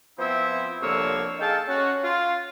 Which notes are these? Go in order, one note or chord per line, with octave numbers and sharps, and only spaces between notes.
F3 B3 C4 E4 C5 E5
C2 D3 F3 A#3 C#5 E6
D#4 G#4 A4 F5 G5 A5
C#4 F#4
F4